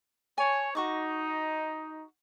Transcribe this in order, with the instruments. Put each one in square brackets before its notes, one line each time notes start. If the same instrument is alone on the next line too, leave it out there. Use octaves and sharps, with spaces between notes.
[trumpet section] C#5 [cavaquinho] G#5 A5
[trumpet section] D#4 [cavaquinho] F#4 C#6 D6